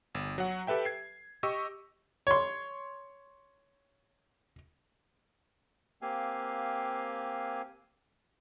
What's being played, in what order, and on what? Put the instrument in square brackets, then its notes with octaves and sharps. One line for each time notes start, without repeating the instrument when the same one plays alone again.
[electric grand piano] G1
F#3 F#5
G4 A4 B4 E5 G5
G#6 C7
G4 D#5 C#6 E6
[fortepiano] C#5 C6
[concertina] A#3 C4 G4 F5 G#5